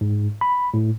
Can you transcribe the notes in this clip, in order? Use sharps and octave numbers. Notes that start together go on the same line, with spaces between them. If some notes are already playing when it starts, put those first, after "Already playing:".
G#2
B5
A2